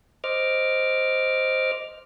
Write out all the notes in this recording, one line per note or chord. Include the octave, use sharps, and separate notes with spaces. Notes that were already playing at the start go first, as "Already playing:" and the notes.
C5 D#5 D6 F6